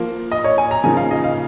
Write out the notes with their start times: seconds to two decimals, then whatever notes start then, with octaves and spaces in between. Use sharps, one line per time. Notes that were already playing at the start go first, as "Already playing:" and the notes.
Already playing: F3 A#3 F4
0.32 D#5
0.44 C#5
0.58 G#5
0.71 A#5
0.84 C#3 F3 A#3 D#4 G#5
0.97 F5
1.11 D#5
1.24 F5